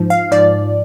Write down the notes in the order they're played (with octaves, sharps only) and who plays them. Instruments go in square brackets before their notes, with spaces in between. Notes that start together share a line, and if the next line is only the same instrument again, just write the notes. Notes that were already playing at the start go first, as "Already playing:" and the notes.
Already playing: [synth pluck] G#2 F3
F5
G#2 F3 D5